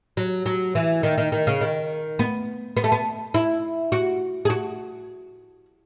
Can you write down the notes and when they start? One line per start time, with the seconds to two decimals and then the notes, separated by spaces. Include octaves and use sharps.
0.17 F#3
0.46 F#3
0.75 E3
1.03 D#3
1.18 D#3
1.32 D#3
1.47 C#3
1.61 D#3
2.19 B3
2.77 B3
2.84 A3
2.92 B3
3.34 E4
3.92 F#4
4.45 G#4
4.50 F#4